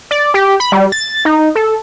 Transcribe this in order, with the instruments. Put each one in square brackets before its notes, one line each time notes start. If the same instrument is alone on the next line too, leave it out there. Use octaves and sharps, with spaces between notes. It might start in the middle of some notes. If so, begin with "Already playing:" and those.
[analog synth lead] D5
G4
B5
G3
A6
D#4
A4